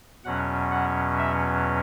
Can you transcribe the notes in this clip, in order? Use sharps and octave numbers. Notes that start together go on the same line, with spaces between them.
E2 B2 F#3 C#4 F#5
F#5
E5